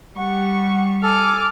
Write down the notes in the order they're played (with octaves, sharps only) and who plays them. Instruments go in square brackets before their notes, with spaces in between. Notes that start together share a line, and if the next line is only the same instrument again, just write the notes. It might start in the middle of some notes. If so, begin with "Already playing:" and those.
[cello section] G3 [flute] F#5 [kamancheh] C#6
[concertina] A4 [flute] G#5 [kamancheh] D6 F6